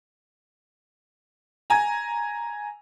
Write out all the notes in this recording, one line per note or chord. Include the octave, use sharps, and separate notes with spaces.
G#5 A#5